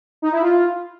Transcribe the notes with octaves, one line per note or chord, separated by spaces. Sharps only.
D#4
E4
F4